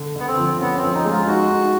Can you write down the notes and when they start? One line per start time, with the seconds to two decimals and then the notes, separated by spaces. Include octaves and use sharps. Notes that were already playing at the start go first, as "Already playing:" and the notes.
Already playing: D3
0.16 D3 B3
0.27 C4
0.38 F3
0.61 B3 C#4
0.77 C4
0.84 F3
0.94 D#4
1.05 G#3
1.11 F4
1.27 D#4 F#4
1.50 D#4